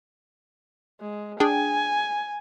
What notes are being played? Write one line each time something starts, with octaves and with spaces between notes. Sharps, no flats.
G#3
D4 G#4 G5 G#5